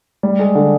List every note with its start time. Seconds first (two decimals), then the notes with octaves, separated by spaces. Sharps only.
0.23 G3
0.39 G#3
0.55 D3